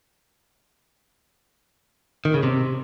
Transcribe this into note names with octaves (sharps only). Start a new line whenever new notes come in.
D#3
C#3
C3